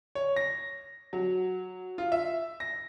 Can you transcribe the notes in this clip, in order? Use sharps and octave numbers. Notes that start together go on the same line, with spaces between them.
C#5
A#6
F#3
F4
E5
A#6